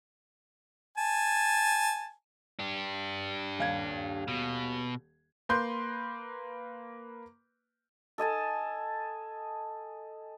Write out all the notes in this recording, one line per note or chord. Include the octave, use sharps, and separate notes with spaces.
G#5 A5
D4 G4
D#1 F5 G#6
B2
A#3 B4 C6 G6
A4 D#5 G#5 A5